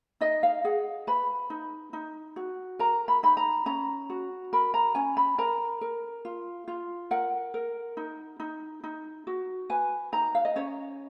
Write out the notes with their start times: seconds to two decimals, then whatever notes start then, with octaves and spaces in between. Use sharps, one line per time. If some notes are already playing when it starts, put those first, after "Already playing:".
0.21 D#4 D#5
0.43 F5
0.64 G#4 F#5
1.07 B4 B5
1.50 D#4
1.93 D#4
2.36 F#4
2.79 A#4 A#5
3.08 B5
3.23 D#4 B5
3.37 A#5
3.66 C#4 A#5
4.10 F#4
4.53 A#4 B5
4.74 A#5
4.95 C#4 G#5
5.17 B5
5.38 A#4 A#5
5.81 A#4
6.25 F4
6.68 F4
7.11 A#4 F#5
7.54 A#4
7.97 D#4
8.40 D#4
8.84 D#4
9.27 F#4
9.70 B4 G#5
10.12 D#4 A#5
10.35 F5
10.45 D#5
10.56 C#4 C#5